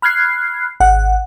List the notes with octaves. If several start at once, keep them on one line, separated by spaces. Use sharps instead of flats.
B5 F6 F#6 G#6 C7
G#1 F#5